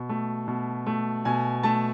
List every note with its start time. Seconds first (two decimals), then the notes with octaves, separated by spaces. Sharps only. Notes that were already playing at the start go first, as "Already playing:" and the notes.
Already playing: B2
0.09 A3
0.48 B2
0.86 A3
1.25 B2 G#5
1.63 A3 A5